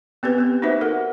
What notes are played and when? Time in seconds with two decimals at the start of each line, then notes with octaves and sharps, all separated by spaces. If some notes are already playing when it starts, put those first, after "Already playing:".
0.23 B3 C4 G4 B4
0.38 B3 G4
0.62 A#3 D#4 F#4 B4 C5 E5
0.81 F#4 A4 A#4 F#5